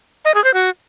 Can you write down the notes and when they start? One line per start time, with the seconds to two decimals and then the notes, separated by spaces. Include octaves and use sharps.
0.25 D#5
0.34 G#4
0.44 C5
0.54 F#4